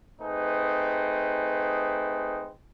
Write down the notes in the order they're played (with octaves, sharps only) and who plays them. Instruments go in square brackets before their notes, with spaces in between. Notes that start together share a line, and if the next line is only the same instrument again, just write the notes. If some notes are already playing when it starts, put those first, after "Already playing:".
[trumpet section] A3 C4 D#4 G#4 B4